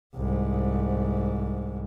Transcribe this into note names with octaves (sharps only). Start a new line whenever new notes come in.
C2 G#2